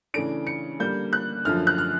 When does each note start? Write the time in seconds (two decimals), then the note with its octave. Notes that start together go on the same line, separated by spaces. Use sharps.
0.14 C#3 E3 A3 D4 D7
0.47 C#7
0.79 D3 G3 A#3 G6
1.13 F#6
1.45 F#2 D3 F3 F6
1.67 F#6
1.78 F6